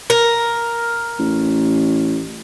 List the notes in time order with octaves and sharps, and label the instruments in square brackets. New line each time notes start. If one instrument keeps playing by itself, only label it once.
[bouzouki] A#4
[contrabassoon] A1